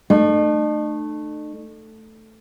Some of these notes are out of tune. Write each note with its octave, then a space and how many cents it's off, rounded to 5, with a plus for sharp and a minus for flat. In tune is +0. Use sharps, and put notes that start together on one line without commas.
A3 +0 D#4 -45